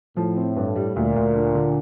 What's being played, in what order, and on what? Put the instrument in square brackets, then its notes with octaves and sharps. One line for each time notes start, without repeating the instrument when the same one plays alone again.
[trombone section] A2 [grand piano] F3
[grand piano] C4
G2
G3
[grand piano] D2 [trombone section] A#2
[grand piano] D2
D3
D3